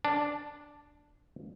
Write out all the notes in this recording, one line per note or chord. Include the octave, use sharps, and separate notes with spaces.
D4